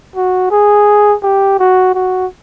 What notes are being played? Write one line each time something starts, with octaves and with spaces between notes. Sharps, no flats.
F#4
G#4
G4
F#4
F#4